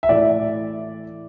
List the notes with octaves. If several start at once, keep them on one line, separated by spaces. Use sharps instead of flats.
E5
A2 E3 A3 D5